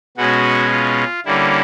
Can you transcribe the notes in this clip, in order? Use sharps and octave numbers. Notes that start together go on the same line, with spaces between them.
B2 G#3 C#4 F#4
F4
D3 G3 A#3 C#4 E4